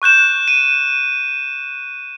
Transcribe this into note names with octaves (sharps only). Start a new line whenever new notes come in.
C#6 F#6 G6 E7
D#7